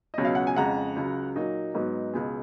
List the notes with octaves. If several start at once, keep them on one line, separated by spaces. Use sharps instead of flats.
C#2 B2 F#3 C#4 D#5
F5
F#5
G#5
F2 C#3 G#3 F#5 A#5
C#2 C#3 F#3
A#2 F#3 A#3 D#4
G#2 F#3 B3 D#4
C#2 B2 G#3